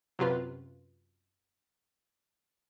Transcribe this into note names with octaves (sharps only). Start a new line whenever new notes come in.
F#2 C3 F4 B4